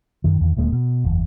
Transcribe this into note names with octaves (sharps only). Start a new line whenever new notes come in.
F#2 D#3
E2 D#3
D#1 D2 G#3 A#3
B2
F#1 E2